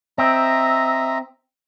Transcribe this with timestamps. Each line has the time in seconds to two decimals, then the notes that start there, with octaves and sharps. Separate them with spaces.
0.18 C4 D#5 E5 A#5